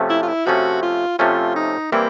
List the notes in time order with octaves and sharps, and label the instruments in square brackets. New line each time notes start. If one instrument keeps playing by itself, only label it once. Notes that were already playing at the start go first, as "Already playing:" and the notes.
Already playing: [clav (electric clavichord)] C3 F3 A3 C#4
[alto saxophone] E4
F4
E4
[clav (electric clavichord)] C3 F3 A3 C#4 [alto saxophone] F#4
[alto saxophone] F4
[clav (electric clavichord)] C3 F3 A3 C#4 [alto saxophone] F4
[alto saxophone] D#4
[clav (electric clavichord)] E3 G3 C4 E4 [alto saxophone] A#3